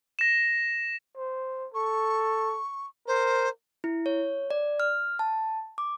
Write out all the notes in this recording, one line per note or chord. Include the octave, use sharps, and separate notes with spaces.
A#6 E7
C5
A4 C#6
A#4 C5
E4
C#5
D5
F6
A5
D6